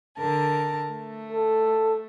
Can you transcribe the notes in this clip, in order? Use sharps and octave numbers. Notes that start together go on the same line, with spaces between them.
D3 A#4 A5
A3
A4